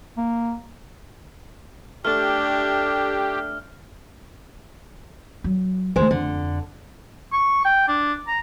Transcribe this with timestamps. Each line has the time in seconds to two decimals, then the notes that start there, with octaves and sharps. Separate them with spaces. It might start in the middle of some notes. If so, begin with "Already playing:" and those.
0.17 A#3
2.05 A3 D4 G4 F6
5.44 F#3
5.96 D#3 G#3 A3 C5
6.11 F2 D3
7.33 C#6
7.65 G5
7.88 D4
8.28 A#5